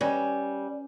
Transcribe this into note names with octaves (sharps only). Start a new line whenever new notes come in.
G3 C#4 B4 D#5